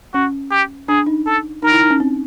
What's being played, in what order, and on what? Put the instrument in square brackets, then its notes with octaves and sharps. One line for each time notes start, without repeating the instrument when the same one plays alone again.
[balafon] C#4 [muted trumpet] F#4
[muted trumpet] G4
[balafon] D4 [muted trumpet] G#4
[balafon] D#4
[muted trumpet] A4
[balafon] D#4 [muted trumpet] A#4
[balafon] E4
D#4
C#4
C4